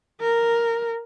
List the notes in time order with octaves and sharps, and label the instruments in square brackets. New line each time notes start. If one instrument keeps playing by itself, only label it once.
[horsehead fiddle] A#4